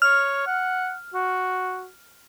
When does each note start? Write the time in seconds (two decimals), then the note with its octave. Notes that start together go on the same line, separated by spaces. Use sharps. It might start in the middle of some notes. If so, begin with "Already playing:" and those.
0.02 C#5 F6
0.47 F#5
1.14 F#4